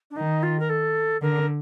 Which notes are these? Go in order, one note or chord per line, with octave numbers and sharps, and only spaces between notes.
D4
D#3 D#4
F4
A#4
A4
D3 A#4